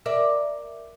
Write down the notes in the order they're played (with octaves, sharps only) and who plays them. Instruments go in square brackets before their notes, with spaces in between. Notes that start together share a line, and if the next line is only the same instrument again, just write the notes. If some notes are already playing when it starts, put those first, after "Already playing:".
[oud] A#4 D5 E5